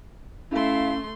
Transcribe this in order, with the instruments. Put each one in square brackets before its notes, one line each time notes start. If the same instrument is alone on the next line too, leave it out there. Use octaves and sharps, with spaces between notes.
[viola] A3 C6 [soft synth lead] C#4 [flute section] E4 F5